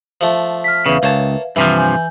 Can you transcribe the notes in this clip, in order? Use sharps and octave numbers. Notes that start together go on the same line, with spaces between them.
F3 A3
F6 B6
E2 C#3 B4 E5 F5
C#2 A#3 C#5 A5
G2 C3 E3 F3
G#5 G6